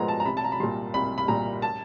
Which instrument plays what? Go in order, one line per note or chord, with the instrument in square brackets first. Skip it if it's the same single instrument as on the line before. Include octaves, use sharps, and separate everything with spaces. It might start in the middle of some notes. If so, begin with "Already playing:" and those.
Already playing: [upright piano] A#2 F3 G#3 B3 A#5
A5
A#5
C2 B5
A5
A#5
B5
A#2 G3 C6
C2 B5
B5
A#2 G3 A#5
A5